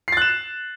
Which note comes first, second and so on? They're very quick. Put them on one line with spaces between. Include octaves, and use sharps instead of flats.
C7 A6 F#6 E7